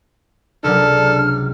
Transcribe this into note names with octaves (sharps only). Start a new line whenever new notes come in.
C#2 C3 F#3 D4 A4 F6